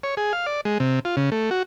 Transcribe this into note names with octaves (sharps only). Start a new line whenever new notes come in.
C#5
G#4
F5
D5
G#3
C3
F4
C#3
A3
F#4